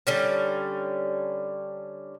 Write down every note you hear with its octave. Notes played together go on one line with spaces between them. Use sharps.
D3 G3 C#4